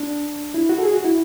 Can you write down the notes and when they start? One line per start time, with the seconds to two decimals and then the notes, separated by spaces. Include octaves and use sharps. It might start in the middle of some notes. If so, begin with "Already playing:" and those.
Already playing: D4
0.54 E4
0.69 F#4
0.78 A4
0.83 G#4
0.94 F#4
1.04 E4